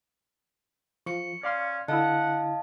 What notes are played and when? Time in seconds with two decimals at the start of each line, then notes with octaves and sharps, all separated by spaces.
1.06 F3 C#6 C#7
1.43 C#4 D5 F5 C6
1.88 D3 E4 D#5 F5 F#5 A5